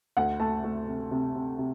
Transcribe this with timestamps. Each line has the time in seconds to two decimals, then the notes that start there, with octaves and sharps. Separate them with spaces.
0.17 D2 F#5
0.40 A3 A5
0.64 A3
0.88 C3
1.11 C3
1.35 C3
1.58 C3